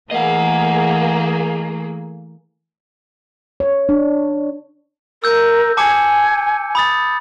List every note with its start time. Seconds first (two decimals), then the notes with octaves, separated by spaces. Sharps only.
0.11 E3 A3 A#3 G#4 D#5 F#5
3.60 C#5
3.89 D4
5.24 A#4 E6 G6
5.77 G#5 A5 D6 C#7
6.75 B5 D#6 A6